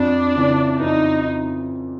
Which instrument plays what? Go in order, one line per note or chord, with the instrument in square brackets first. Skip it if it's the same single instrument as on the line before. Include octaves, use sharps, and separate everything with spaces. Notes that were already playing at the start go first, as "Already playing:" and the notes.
Already playing: [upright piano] F2 [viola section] D4
[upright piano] C#3 E3
[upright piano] F2 [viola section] D#4